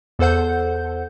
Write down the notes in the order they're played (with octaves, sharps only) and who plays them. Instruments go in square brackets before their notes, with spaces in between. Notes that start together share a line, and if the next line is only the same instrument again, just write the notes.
[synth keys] E2 A4 C5 F#5 G6